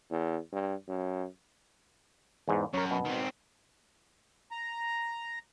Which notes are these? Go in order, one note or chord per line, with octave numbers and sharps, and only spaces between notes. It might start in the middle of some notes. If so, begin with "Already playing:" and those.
E2
G2
F#2
E2 G#2
F#2 A#4 C#5
B2
D#3 C4
A#5